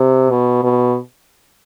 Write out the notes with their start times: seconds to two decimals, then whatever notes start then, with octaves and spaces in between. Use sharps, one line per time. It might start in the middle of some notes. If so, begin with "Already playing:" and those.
Already playing: C3
0.31 B2
0.63 B2